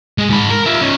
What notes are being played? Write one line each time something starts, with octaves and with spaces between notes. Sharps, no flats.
G#3
G#2 B5
A#4
F4 E5
C#4 D#4